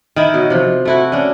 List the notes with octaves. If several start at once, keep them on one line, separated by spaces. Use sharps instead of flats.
D#3 E4
B2 F#3
C3 F3
A3 E4 F#4
C#4 D4